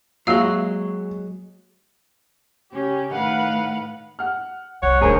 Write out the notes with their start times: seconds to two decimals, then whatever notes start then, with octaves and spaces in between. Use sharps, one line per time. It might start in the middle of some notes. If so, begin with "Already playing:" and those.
0.27 F#3 G#3 A#3 F#4 F5
2.70 C#3 C#4 G4
3.12 A2 D#3 B4 F5 F#5
4.19 F#5 F6
4.83 C2 C#5 F#5
5.01 D#1 D2 D#3 G#4 A#4 C5